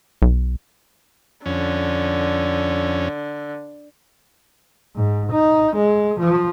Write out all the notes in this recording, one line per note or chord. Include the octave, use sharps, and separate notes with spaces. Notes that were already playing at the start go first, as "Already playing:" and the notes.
B1
F2 D3 C#4
G#2
D#4
G#3
F3